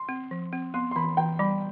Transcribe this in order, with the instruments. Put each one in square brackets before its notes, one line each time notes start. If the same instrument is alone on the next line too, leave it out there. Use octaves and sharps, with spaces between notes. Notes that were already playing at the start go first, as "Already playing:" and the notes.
Already playing: [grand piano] C6
[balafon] C4
F3
C4
[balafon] B3 [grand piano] C6
[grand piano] C6
[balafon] E3 [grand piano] B5
[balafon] E3 [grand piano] G5
[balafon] G3 [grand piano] B5